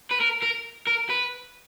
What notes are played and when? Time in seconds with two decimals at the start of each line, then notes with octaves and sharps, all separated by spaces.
0.11 B4
0.21 A#4
0.43 A#4
0.87 A#4
1.10 B4